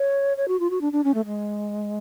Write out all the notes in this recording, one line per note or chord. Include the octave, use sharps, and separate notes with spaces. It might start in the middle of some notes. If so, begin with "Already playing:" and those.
Already playing: C#5
C#5
F#4
F4
F#4
D4
D4
C#4
A3
G#3